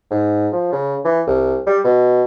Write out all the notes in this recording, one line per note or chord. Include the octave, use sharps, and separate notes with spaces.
G#2
F3
C#3
E3
C2
G3
B2